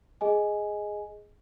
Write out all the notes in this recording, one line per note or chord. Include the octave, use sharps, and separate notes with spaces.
G#4 D#5 G#5